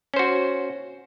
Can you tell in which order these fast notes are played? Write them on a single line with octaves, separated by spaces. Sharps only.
C#4 C5 F#4